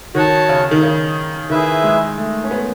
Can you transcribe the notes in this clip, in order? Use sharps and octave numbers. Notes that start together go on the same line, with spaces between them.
D#3 F#4 C#5 F#5 A5
C#3
D#3
C#3
D#3 E4 G#4 B4 E5
G#3
A3
C#4
B3